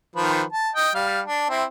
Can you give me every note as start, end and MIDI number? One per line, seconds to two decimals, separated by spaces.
0.16 0.43 51
0.16 0.43 53
0.16 0.43 71
0.53 0.70 81
0.75 0.90 75
0.75 0.90 79
0.95 1.21 55
0.95 1.21 77
1.26 1.46 62
1.50 1.64 60
1.50 1.64 64